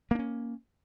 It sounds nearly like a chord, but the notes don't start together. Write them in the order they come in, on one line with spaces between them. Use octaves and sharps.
A#3 D4 C#4